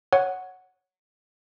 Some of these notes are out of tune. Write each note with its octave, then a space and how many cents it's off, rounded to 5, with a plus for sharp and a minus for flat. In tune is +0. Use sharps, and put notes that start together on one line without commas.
C#5 +0 F#5 +0